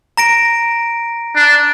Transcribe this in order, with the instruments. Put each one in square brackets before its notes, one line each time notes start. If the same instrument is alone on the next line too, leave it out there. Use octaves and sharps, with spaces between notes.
[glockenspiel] A#5 A#6 D7
[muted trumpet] D4